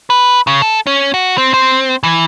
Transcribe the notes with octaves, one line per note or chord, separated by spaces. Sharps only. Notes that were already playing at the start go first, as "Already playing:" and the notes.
B4
C#3
A4
C#4
F#4
C4
C4
E3